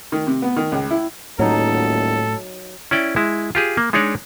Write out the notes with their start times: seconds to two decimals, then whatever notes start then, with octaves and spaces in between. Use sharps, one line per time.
0.12 D#3
0.27 C3
0.42 B3
0.56 D#3
0.72 C#2
0.91 E4
1.39 D#1 A2 F#3 D#4 A4
2.91 C#4 E4 D5 G5
3.16 G#3 E4
3.55 F4 G4 G#4
3.77 A#3
3.93 G#3 D4 D#4 C#5 D5